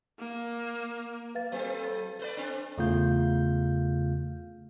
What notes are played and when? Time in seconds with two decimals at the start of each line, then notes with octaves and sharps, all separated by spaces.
0.19 A#3
1.35 B4 F5 A6
1.52 F#3 C4 A4 C5
1.84 A6
2.19 A3 B4 D5
2.37 C4 D4
2.78 E2 C#3 A3 F4 F5 G6